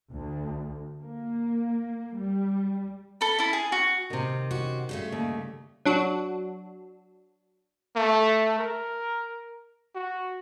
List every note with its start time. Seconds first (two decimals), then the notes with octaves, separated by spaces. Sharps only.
0.12 D2
1.00 A#3
2.16 G3
3.21 A4 B5
3.38 E4 A5
3.53 G#4
3.72 F#4
4.10 C3 D#3
4.51 C#4 F#4
4.89 G2 C#3 A3
5.12 D#2
5.85 F#3 D4 F#4
7.96 A3
8.59 A#4
9.95 F#4